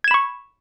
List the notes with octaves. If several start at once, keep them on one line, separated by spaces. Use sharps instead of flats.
B5 C#6 G#6 E7